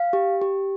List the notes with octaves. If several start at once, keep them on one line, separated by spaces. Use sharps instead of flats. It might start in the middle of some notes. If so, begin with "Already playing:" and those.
Already playing: F5
G4
G4